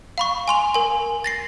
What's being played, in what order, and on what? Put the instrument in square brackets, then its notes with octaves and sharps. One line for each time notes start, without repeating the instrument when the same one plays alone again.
[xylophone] F5 B5 C#6
G#5 C6 F7
A#4 G#5
A6 A#6 C7